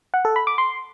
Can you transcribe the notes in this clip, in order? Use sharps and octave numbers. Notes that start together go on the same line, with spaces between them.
F#5
A4
B5
D6
C6